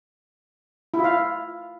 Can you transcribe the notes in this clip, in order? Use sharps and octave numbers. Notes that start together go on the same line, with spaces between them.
E4
F4
F5